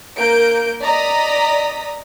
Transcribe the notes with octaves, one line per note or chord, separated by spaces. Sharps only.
A#3 A#4 G6 D7
D5 D#5 A#5 D#6 B6